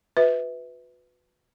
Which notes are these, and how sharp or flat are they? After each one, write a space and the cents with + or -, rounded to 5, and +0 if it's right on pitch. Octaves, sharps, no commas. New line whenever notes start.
F#4 -40 B4 +10 E5 -25